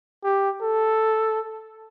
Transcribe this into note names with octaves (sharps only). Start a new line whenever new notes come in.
G4
A4